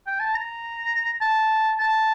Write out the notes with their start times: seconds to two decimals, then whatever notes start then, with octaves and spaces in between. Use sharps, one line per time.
0.07 G5
0.20 A5
0.34 A#5
1.21 A5
1.80 A5